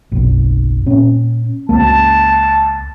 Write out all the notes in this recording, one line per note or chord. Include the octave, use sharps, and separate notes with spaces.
F#1 B1
A#2 C#4
C#2 A#3 A5